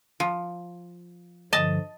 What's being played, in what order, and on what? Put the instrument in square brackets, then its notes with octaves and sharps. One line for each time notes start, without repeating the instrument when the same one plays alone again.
[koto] F3
[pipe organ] G2 D3 F3 [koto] D#5 A5